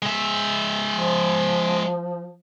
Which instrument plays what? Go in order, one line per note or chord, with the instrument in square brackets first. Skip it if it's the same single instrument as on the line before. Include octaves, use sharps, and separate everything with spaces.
[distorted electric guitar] G#3 E5
[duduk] F3